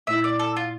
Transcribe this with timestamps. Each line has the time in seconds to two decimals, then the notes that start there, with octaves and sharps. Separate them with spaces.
0.07 A#2 A3 E4 E5
0.24 D5
0.39 A4
0.56 F4